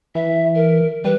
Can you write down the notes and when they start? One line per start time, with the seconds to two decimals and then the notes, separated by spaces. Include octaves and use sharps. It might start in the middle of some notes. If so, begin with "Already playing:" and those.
0.15 E3 E5
0.55 A#4
1.05 G3 B4